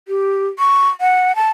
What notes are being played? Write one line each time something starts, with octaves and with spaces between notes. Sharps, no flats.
G4
C#6
F#5
A5